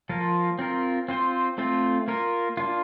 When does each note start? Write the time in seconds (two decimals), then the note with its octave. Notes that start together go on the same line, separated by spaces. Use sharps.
0.09 F3 A#3 F4 A#4
0.59 C4 F4 A#4
1.08 C4 F4 C5
1.58 A3 C4 F4
2.08 A#3 F4 A#4
2.57 A#3 D4 F4